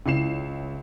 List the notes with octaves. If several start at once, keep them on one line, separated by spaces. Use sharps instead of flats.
C#2 E4 C7 E7